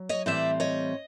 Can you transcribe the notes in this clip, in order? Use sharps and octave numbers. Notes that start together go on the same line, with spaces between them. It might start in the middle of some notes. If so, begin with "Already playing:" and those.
Already playing: F#3
C#5 D#5
A2 E3 G3 C4 D5 E5
C#5 D#5